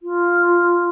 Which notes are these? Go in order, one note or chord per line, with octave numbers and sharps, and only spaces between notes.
F4